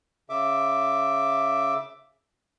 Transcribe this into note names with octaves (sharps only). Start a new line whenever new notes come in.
C#3 E5 D6